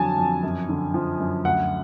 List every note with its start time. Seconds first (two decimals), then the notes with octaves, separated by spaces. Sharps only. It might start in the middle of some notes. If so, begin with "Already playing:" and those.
Already playing: F2 D3 F#3 G#5 A5
0.18 F2
0.43 F#2
0.69 D3
0.94 F3
1.20 F#2
1.45 D2 F#5